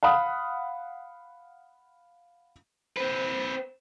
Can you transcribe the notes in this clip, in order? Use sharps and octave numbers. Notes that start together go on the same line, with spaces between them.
F5 F#5 B5 D#6
C4 B4 C5